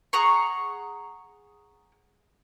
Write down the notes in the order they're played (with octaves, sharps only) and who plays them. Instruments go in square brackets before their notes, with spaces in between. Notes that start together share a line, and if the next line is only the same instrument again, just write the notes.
[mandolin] G#4 F#5 A#5 C#6